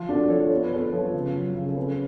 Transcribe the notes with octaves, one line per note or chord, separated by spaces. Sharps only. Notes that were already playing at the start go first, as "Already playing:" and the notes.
Already playing: F3 F4
A3 D4 F#4
F3 A4 C#5
B3 C#5
B4
B3 A4 C#5
F3
C#3
F#3
C#3
A4
C#4 G#4 B4